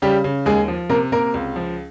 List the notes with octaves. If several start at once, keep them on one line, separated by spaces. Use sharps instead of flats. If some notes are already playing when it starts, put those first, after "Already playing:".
C#3 G3 G4
C#3
D#2 G#3 G#4
F3
C3 A#3 A#4
C3 A#3 A#4
C#2
F3